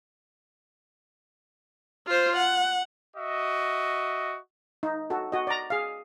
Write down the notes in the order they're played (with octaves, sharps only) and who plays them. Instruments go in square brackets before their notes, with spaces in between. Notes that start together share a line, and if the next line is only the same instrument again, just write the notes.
[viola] F4 C5
F#5
[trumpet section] F#4 D#5 E5
[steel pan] D#4
F#4 A4
F#4 D#5
D5 A#5
G#4 F5